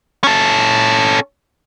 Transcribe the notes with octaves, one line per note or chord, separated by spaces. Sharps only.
C#4 A4